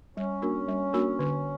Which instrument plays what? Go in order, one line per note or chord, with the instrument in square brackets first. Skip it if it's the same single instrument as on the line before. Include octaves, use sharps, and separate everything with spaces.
[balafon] G3 [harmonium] C#4
[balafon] A#3 D4 F#4 A#4
G3
A#3 D4 F#4 A#4
D3